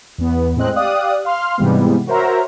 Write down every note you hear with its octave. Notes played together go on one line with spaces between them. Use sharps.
E2 B3
A2 G#3 C4 D#5 F#6
G4 D5 F5 D#6 F#6
F5 C6 F6
G#2 C3 E3 G3 G#3 B3
F#4 A#4 C5 C#5 E5 A#5